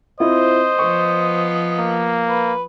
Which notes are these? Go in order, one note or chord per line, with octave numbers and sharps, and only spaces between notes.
C4 E4 F4 C5 D#5
F3 B3 C#6
A#3
B4